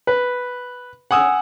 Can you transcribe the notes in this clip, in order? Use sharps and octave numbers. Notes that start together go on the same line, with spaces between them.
B4
F#5 G#5 D#6 E6